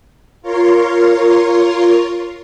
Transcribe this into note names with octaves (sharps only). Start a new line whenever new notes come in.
F4 A#4 C#5 C6